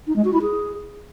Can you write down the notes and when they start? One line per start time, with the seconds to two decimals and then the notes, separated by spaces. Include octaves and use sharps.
0.07 D#4
0.16 G#3
0.25 F#4
0.33 E4
0.42 G#4